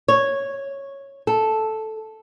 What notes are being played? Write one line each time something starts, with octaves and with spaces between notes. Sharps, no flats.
C#5
A4